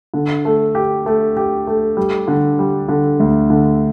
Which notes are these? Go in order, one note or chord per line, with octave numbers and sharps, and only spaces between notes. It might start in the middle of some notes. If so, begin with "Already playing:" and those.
D3
A3
G4
A3
G4
A3
G3
D3
G3
D3
D2
D3